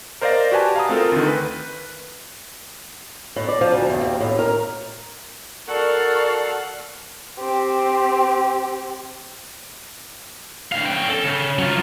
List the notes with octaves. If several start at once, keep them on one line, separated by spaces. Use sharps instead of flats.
A#4 C5 D5 D#5 F5 A#6
F#4 G4 B4 G#5 A5
F5 A#5 D#6
A3 C4 F4 A4 A#4
D2 D#3
B4
A2
D5
F3
D2
E2
D#2
A2
A#4
F#4 A4 A#4 D5 F5 F#5 C#6
C4 G4
D2 F5
C#4 G5
A4
C#3
F#3 F4